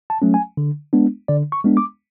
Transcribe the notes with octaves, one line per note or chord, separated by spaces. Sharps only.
A5
F#3 A3 C#4
G#5
D3
G#3 B3 D4
D3 D5
C#6
G#3 B3 D4
D6